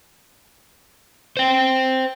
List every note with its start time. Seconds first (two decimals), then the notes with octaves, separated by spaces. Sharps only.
1.37 C5 G5